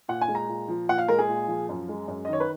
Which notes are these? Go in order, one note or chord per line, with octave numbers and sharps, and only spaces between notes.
A#2 F#5
G#5
G#3
A#5
A#2
F3
A#2 F#5
F5
G#3 A#4
G#4
A#2
F3
F#2
G#3
F#2
D#5
D#3 C#5
B4